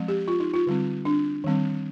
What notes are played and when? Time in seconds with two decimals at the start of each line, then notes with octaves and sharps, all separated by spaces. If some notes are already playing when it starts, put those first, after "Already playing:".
Already playing: F3 G#3 C4
0.08 G4
0.28 F4
0.40 D#4
0.54 F4
0.67 D3 G3 C4
1.05 D4
1.44 D#3 G3 C4